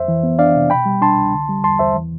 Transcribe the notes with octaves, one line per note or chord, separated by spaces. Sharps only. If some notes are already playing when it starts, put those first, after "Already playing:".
Already playing: F2 C5 E5
E3
B3
D4 D5 F5
C3
B2 G5 B5
G3
D4 A5 C6
C2
D3
G3
E2 A5 C6
E2 C5 E5
E3